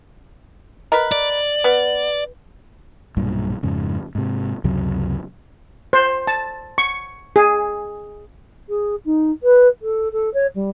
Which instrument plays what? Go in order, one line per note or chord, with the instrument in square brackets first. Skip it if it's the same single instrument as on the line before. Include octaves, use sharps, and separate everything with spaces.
[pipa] A#4 B4 [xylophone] D#5
[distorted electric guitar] D5
[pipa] B3 [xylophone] B4
[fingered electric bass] B1 G2 A#2
F2 G#2 C#3
G#2 C3
C#2 F#2 C3 F#3
[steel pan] C5
A5
C#6
G#4
[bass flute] G#4
D#4
B4
A4
A4
C#5
G3